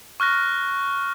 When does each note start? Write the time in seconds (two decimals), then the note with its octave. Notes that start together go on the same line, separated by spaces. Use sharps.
0.20 C#6 F6 F#6 A#6